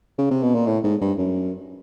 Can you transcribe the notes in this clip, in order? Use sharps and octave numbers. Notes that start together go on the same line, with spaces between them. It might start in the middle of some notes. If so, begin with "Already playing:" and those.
C#3
C3
B2
A#2
A2
G#2
G2
F#2